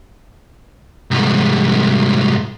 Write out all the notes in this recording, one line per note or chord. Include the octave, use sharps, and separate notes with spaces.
C2 G#2